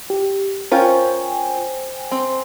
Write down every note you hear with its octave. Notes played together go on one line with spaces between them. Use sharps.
G4
C#4 F4 A#4 C5 G5 G#5
C4